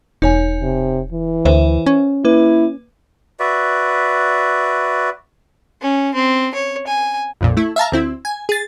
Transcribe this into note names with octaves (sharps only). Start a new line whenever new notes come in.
E1 D#4 C#5 G#5
C3
E3
D2 B4 C5 E5
C#4
A#3 E4 B4
F#4 B4 D5 E5
C#4
C4
C#5
G#5
A#1 F2 A#2
A3 E4
E5 F5 A5 A#5
D2 C4 E4
G#5
G#4 A6